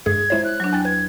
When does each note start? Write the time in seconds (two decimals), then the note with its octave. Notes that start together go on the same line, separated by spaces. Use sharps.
0.06 G2 G#3 G#4 G#6
0.30 G#3 E4 C5 C#5 E5
0.44 F#6
0.60 F#3 D4
0.73 E2 G5 A6
0.85 B4 G#6